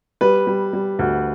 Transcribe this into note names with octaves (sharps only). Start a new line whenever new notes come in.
G3 B4
G3
G3
D2